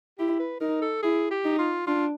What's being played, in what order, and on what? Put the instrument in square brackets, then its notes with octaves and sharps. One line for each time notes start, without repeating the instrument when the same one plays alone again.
[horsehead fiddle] E4 [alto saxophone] G4
[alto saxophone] B4
[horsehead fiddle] D#4 [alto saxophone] A#4
[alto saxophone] A4
[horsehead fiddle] E4 [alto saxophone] G#4
[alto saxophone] G4
[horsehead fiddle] D#4
[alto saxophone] F4
[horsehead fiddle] D4 [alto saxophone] F4